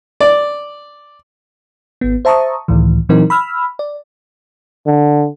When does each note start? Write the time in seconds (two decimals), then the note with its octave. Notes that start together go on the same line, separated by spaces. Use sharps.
0.20 D5
2.01 G#1 B3
2.25 C5 E5 A5 A#5 C#6 D#6
2.68 C#2 A2 D#3 E3
3.09 A#2 E3 F#3 C4 D#4 A#4
3.30 B5 E6 F6
3.79 D5
4.87 D3